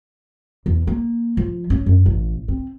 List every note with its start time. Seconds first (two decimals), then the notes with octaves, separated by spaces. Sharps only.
0.66 E2
0.87 A#3
1.37 F3
1.70 C#4
1.86 F#2
2.06 A1
2.48 C4